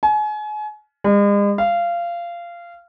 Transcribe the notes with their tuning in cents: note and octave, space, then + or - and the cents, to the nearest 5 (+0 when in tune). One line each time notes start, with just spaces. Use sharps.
G#5 +35
G#3 -40
F5 -20